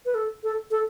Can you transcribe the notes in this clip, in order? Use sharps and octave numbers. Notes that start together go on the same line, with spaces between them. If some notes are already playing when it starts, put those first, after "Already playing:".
B4
A4
A4
A4